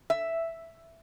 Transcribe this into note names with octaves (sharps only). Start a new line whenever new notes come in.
E5